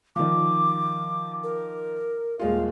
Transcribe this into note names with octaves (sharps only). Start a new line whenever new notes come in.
D#3 F3 D6
A#4
D#1 G#3 F4 F5